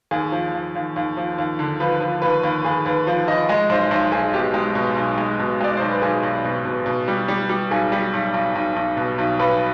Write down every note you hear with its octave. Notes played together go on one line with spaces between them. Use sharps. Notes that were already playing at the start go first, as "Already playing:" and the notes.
D#2 G#4
F3
D#2
D#2
D#2
F3
D#2
D3
F3 B4
F3
D#2 B4
D#2
D#2 G#4
D#2 B4
F3
F3 D#5
G#3 D#5
B1 C5
B1 C5
B1 G#4
B2 G4
G#3
B2
B1
G#3
B2
G#3 D5
B1 C5
B4
B1 G#4
B1
B2
B2
B2
G3
G3
G3
B1 G#4
G3
B1
B1
B1
B1
B2
B1
B1 B4